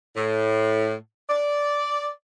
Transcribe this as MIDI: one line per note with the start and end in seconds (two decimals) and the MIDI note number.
0.16 0.94 45
1.29 2.08 74